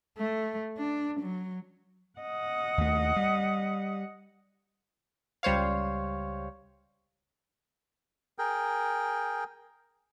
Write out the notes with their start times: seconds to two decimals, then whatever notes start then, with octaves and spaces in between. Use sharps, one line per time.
0.18 A3
0.78 D4
1.21 F#3
2.19 D#5 F#5
2.78 D#2 A3
3.16 G3
5.43 C#2 G3 C5 C#5 F5
8.39 G#4 A#4 G5